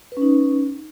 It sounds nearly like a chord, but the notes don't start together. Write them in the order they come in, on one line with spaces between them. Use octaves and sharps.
B4 C#4 D#4